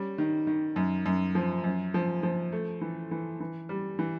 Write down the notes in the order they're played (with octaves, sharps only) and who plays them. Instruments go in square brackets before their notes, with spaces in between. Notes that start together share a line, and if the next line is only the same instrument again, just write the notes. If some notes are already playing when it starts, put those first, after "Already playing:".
Already playing: [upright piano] G3 C#4
D#3
D#3
F#2
F#2
F3
F#2
F3
F3
A3
E3
E3
E3
G3
E3